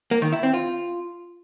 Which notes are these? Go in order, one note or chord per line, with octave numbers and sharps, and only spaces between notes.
A#3
D#3
E4
C4
F4